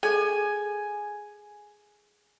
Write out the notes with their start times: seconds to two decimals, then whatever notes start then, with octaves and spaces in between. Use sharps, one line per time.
0.03 G#4 A4 G#5